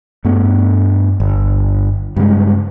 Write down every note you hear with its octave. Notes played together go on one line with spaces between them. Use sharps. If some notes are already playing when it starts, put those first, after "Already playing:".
G2 A3 B3
G1
G2 C#3 G#3